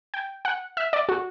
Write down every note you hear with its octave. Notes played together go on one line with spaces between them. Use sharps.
G5
F#5
E5
D5
F#4